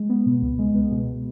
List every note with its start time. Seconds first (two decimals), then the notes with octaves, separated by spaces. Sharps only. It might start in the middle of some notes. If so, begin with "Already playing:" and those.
Already playing: G#3
0.09 B3
0.26 B2
0.42 C#2
0.59 G#3
0.75 B3
0.91 B2